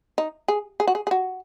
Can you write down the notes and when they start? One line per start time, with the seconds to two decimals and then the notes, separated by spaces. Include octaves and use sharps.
0.18 D#4
0.48 G#4
0.80 G#4
0.87 F#4
0.95 G#4
1.07 G#4
1.11 F#4